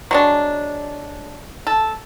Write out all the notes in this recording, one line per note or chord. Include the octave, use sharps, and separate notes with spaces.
F#3 G#3 D4
A4